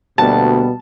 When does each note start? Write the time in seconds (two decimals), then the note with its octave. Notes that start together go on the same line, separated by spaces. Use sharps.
0.18 D2 B2 G3 A#3 B3 A5